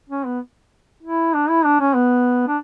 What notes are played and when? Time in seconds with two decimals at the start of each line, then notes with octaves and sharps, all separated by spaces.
0.10 C#4
0.26 B3
1.03 E4
1.34 D4
1.50 E4
1.65 D4
1.81 C#4
1.95 B3
2.48 D4